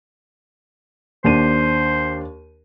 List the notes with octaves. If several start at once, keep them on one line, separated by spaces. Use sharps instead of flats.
D#2 D4 C5 D#7